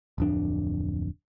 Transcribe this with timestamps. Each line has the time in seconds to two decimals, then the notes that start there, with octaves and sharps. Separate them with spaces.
0.18 D1 F2 D4